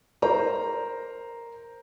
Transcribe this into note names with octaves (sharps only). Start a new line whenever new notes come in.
A#4 C5 A#5